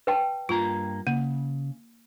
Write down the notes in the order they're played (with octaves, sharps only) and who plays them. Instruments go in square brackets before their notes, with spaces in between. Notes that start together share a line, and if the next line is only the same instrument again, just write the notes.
[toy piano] B4 G5 A5
[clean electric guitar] G2 A#3 A#5 [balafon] F4
[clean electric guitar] C#3 [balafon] A#3